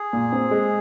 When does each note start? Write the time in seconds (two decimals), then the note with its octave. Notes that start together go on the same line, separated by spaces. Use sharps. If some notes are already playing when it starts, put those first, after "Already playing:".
Already playing: G#4
0.13 A#2
0.32 C4
0.51 G#3